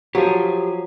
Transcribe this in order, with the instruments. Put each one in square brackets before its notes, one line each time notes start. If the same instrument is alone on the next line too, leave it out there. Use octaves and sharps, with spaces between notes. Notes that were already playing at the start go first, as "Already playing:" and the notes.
[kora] F3 F#3 [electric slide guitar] G4 G#4